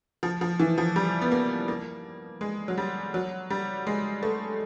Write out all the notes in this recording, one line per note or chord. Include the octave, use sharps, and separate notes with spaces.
F3
F3
E3
F3
G3
B3
A#3
A#3
G#3
F#3
G3
F#3
G3
G#3
A3